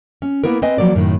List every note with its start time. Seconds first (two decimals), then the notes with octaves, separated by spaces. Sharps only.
0.22 C#4
0.44 A#3 B3 E4 A#4
0.62 C4 B4 D#5 G#5
0.78 F3 F#3 A#3 D5
0.95 F#2 A2 D#3